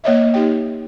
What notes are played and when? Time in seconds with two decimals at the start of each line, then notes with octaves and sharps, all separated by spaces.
0.04 A#3 C#5 D#5 E5
0.34 D#4 G4 G5